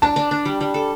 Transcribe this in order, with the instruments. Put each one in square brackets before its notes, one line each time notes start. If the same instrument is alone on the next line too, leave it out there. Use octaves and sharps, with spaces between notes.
[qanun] D4 [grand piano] A5
[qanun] D4
D4
G3
G3
A4